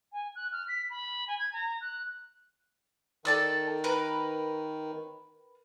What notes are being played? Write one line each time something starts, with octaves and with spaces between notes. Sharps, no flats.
G#5
F#6
F6
B6
B5
G#5
G#6
A#5
F#6
D#3 A4 D5 E6
A#4 B4